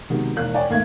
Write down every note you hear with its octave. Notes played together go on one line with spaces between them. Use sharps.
C3 D#3 F#3 G#3 B3
E1 D#2 F#6
C#5 D5 G5 G#5
G#1 D#2 A3 A#3 E5 G#6